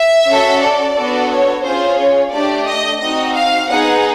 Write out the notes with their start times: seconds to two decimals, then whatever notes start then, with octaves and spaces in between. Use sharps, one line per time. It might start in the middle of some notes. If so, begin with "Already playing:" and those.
Already playing: E5
0.27 C#4 F#4 A4
0.61 D5
0.95 B3 D4 F#4 A4
1.29 C#5
1.64 C#4 F4 G#4 C5
1.99 C#5
2.32 A3 D4 G4 D5
2.67 D#5
3.00 C4 D#4 F#4 D#5
3.34 F5
3.69 B3 D#4 G#4 F#5